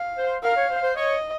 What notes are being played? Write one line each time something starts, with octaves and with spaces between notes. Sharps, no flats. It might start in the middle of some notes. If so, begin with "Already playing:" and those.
Already playing: F5
C5
A#4 F5
C#5
C5
C5
C#5 D#5